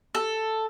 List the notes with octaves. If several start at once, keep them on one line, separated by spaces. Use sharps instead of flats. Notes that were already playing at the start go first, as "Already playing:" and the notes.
A4